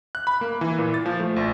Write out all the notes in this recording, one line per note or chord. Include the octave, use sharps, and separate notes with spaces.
F#6
B5
A#3
E3
A#2
A6
F3
A3
A#1